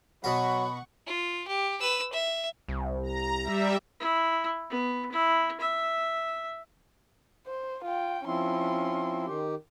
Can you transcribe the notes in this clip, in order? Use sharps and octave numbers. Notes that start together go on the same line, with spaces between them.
B2 F#3 F#4 F#5 B5 C#6
F4
G4
B4 E6
E5
C2
A#5
G3 E5
E4
B3
E4
E5
C5
F4 G5
F3 C4 C#4 E4 C6
D#3 G4